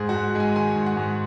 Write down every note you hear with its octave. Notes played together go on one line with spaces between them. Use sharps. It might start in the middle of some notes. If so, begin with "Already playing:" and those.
Already playing: G#2 G#4
F#4
G#2
G#3 G#5
D#3 G#5
G#2
F#5
G#2